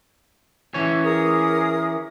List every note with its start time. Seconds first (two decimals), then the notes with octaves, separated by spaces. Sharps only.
0.74 E3 C#4 C#5
1.03 G#4 A#4 D#6